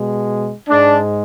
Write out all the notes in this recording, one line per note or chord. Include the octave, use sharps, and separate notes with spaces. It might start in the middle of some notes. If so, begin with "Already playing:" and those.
Already playing: B2 G#3
G#2 G#3 D4